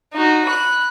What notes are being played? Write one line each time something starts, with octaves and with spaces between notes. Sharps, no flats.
D#4 F#4
B5 F#6